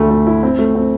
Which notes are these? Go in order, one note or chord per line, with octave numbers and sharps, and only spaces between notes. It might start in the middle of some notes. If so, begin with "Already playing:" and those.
Already playing: D2 A3
A3
E4
C4
A3
C4